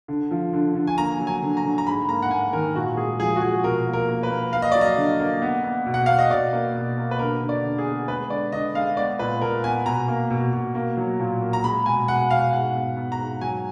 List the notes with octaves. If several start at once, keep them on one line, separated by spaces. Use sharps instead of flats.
D3
F3
D3
D3
G#5
A#3 A#5
F#3
G#5
D3
A#5
D3
A#5
G#2 B5
A#3 A#5
F#5
A#3 G#5
D#3 A#4
A#2 F#4
G#3 G#4
F3 G#4
F#4
F3 G#4
B2 A#4
A#3
A#4
A#3
B4
A#3
A#3 F5
D#5
F#3 D5
D#5
D3
A#3
B3
B3
B2
F#5
B3 F5
D#5
B2 D5
A#3
B2
A#3
B4
D3 A#4
D3
D5
D3
G#4
B3
G#3 B4
D3 D5
D3 D#5
G#3 F5
B3 D5
A#2 B4
A#2 A#4
B3 G#5
B2 A#5
A#3
B2
B2
A#3
F#3
A#2
A#3
A#5
G#3 B5
B2 G#5
B2 F#5
B2 F5
G#2 F#5
B3
B3
A#5
G#2
F#3 G#5